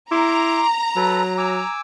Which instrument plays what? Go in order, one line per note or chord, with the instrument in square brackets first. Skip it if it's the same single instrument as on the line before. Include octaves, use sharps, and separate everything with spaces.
[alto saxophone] E4 [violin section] A#5 [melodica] C6 D6
[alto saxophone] F#3 [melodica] A4 B4
[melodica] G#5 D6 E6